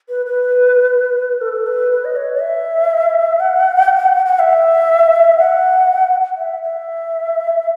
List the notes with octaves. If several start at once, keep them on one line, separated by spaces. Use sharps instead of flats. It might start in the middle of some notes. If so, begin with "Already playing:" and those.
B4
B4
A4
B4
B4
D#5
C#5
E5
F#5
F#5
E5
F#5
E5
E5